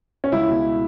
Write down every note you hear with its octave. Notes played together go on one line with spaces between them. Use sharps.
C#4
C#2 E4
B2